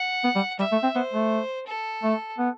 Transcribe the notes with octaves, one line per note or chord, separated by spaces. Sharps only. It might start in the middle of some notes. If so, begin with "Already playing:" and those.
Already playing: F#5
B3
G3
G3 E5
A3
C4
B3 C5
A3
A4
A3
B3